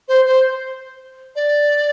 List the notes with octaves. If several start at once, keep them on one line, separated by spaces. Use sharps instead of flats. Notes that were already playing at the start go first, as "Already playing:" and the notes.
C5
C5
D5